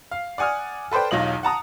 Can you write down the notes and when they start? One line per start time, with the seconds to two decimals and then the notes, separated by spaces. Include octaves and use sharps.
0.11 F5
0.38 D5 F#5 G#5 D#6 F6
0.91 A4 B4 C5 D5 G5
1.11 B1 E2 F#3 F4 D#5 F#7
1.43 F#5 A5 A#5 D#6